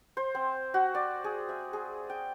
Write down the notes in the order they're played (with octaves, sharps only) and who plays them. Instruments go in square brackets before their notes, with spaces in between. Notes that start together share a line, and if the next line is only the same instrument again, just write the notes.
[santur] C5
C4
F#4
D5
G#4
E5
G#4
G5